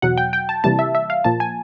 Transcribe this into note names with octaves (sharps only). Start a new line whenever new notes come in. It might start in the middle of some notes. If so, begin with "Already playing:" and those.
E2 B2 F#3 F#5
G5
G5
A5
C3 E3 G3 A#3 A5
E5
E5
F5
A#2 F3 A#3 A5
G#5